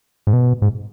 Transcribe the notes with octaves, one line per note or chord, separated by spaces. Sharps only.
G#2
B2
G#2